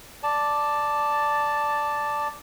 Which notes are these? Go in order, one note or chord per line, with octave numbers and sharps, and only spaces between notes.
D5 A5